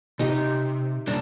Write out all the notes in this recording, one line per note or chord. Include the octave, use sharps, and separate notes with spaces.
C3 D#4 G4
C3 G3 A#3 D4